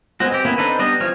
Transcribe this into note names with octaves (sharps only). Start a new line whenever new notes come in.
G#3 B3 C4 F#4
C4 G4
A#3 B3 C#4 E4
C4 D4 D#4 A4 B4
G3 B3 D4 D#5
E3 F3 C4 C#5 F6